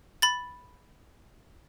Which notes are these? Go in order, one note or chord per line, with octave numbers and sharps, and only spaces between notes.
B5 A6